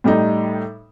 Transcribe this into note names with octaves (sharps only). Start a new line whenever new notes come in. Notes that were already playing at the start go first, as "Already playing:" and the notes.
A2 G3 A3 D#4